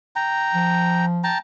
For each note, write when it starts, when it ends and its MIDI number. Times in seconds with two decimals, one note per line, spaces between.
0.16 1.05 79
0.16 1.05 82
0.54 1.32 53
1.24 1.38 79
1.24 1.38 81
1.24 1.38 82